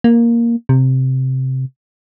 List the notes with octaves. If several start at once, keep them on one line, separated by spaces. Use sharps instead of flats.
A#3
C3